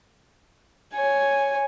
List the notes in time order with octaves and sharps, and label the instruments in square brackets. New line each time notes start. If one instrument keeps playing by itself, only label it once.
[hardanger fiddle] C#5 [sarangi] G#5